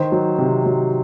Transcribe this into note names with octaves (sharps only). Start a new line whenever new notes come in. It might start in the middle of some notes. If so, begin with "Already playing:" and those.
Already playing: D#3 C5
F#3
C3
F#3